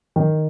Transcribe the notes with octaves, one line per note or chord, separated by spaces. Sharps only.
D#3